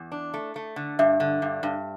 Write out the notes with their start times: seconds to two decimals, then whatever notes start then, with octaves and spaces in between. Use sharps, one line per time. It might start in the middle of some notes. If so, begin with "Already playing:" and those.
Already playing: E2
0.12 D4
0.34 A3
0.56 A3
0.76 D3
0.99 G2 E5
1.20 D3
1.42 G2
1.63 G2